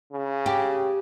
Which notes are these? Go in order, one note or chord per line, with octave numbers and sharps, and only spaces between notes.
C#3
G4